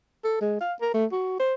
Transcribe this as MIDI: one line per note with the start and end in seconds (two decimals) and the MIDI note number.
0.24 0.41 69
0.41 0.56 56
0.61 0.73 77
0.81 0.91 70
0.94 1.05 57
1.12 1.36 66
1.39 1.54 72